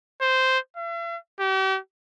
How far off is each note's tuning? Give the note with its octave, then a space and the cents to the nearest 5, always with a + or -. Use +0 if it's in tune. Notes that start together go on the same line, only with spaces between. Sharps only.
C5 -5
E5 +45
G4 -40